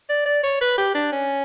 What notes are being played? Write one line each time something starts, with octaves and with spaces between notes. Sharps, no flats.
D5
D5
C#5
B4
G4
D4
C#4